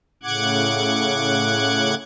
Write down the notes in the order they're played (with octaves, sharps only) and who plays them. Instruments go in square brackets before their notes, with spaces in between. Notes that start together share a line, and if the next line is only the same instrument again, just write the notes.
[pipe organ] A2 C#3 F#5 D6 F#6 G#6